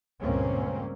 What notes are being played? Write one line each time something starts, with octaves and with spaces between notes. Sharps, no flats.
C#2 G2 A#2 A#3 C4 C#4